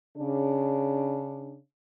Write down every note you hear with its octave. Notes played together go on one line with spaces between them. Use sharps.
C#3 D4